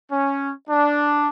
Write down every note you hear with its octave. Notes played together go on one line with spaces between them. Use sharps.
C#4
D4